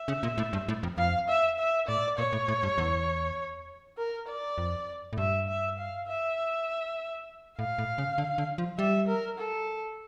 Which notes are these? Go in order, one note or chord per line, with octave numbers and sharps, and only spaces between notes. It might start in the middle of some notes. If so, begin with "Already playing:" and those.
Already playing: E5
C#3
A#2
A2
G2
A2
F2
F2 F5
E5
E5
A2 D5
A#2 C#5
A2
A2
G2
E2
A#4
D5
F2
A2
G2 E5
E5
F5
E5
A2 F5
A2
C#3
D3
D3
F3
G3 E5
A#4
A4